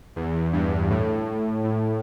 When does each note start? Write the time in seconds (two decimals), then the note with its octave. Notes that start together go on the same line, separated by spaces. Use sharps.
0.16 E2
0.53 G2
0.90 A2
1.64 A2